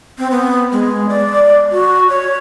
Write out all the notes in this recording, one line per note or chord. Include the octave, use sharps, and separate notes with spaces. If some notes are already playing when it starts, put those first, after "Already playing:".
C4
B3
G#3
D5
F#4
C#5